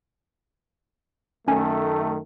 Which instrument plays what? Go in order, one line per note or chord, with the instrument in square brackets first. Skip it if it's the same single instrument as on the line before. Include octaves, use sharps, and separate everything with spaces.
[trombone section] F#2 D#3 A3 [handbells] C#4 G#5